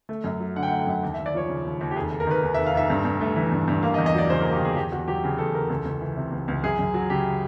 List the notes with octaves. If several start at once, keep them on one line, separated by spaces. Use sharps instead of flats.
A3
F#2
F#3
D3 F#5
G5
F#5
A3
G5
F#2 F#5
D#2
E5
D#2
D5
F3 C#5
C#3
D#2
D#2
G4
F1 G#4
F1
A#4
D#3 B4
D#2
E5
F1
F5
F1 E5
G2
G2
A3
E3
G2
G2
A#3 F5
D#5
E2
D#5
F#3 D5
C#3 C5
A#4
A#3
G4
E2 G#4
E2 G4
E2 F#4
F#3 G4
C#3 G#4
E2 A4
E2 A#4
C#2 A4
C#2
E3
C3
C#2
C#2
F#2 G#4
F#2
F#3
C#3 G4